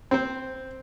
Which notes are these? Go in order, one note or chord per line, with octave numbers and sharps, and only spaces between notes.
C4 C5